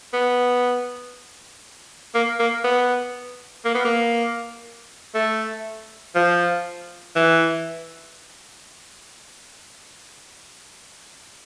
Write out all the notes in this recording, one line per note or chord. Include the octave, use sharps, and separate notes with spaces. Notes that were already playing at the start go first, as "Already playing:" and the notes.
B3
A#3
A#3
B3
A#3
B3
A#3
A3
F3
E3